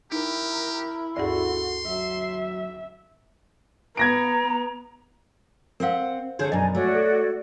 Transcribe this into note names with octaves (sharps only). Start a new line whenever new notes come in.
D#4 E4 G4 A#4
D2 G2 F#4 G#4 A4 C6
F#3 E5
B3 A#5 G#6 A#6 D7
C4 A#4 C5 F5 F#5
D3 G#4 C5 C#5 G6
F#2 B2 D4 D#5 G#5 A#5
A3 F#4 C#5 D5
A4